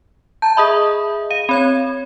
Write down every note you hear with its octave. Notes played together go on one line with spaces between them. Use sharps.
A5 A#5 G6
G#4 D#5 E5 B5 D#6
F5 D#7
C4 C#5 B5 G#6